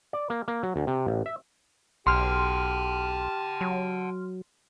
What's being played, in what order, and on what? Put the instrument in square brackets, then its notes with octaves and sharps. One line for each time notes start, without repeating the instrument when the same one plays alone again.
[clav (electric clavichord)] D5
A#3
A#3
F#3
D2
C3
A1
E5
[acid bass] B1 [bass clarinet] G4 [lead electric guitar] F#5 A5 [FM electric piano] C6 F6
[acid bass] F#3